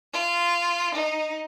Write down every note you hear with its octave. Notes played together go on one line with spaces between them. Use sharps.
F4
D#4